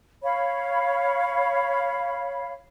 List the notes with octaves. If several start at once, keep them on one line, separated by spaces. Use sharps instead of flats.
C#5 F5 B5